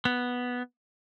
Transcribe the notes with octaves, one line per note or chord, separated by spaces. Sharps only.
B3